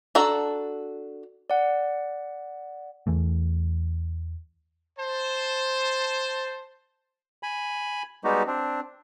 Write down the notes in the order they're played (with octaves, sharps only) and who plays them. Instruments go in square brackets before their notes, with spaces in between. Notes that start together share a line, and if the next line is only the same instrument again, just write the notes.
[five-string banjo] D4 F#4 A4 A#5
[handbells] D5 F#5
[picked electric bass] E2 E3 A3
[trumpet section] C5 A5
[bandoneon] G#5 B5
G3 G#3 B3 D#4 F#4 G4
C4 D4